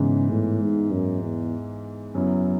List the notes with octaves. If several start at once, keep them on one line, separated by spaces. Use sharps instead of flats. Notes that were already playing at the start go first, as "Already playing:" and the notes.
Already playing: G#2 C#3 E3 B3
A2
G#2
F#2
E2
F#2 C#3 F#3 B3 E4